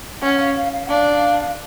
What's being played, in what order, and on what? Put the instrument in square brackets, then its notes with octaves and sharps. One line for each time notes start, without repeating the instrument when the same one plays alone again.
[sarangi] C#4 [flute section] F#5
[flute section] F5
F5
F5
F#5
[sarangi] D4 [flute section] F5